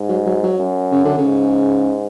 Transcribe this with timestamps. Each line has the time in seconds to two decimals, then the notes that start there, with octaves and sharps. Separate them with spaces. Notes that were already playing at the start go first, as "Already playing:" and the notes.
Already playing: G#2
0.09 F#3
0.26 F#3
0.43 F#3
0.58 F#2
0.92 C#3
1.05 D3
1.18 C#3
1.24 G#2